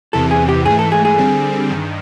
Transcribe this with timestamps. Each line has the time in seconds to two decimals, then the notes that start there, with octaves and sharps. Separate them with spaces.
0.13 E2 C3 E3 A4
0.31 G#4
0.49 G4
0.66 G#2 E3 A3 G#4
0.79 A4
0.92 G#4
1.05 G#4
1.18 D3 G3 C4
1.70 G2 D#3